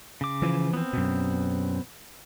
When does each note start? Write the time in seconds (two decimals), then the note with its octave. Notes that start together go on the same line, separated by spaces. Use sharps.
0.21 C#3 D6
0.42 E3 F3
0.73 B3 C4
0.93 F#2 B2